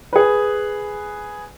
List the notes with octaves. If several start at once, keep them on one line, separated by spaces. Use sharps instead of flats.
G#4 B4